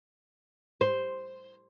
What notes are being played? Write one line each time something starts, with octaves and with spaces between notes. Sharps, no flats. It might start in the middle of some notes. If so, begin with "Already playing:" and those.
C5